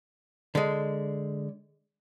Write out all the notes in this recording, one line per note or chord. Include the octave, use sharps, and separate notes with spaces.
D3 G#3